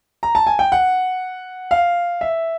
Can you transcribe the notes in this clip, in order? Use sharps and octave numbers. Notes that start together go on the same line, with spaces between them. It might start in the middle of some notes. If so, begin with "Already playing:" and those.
A#5
A5
G#5
G5
F#5
F5
E5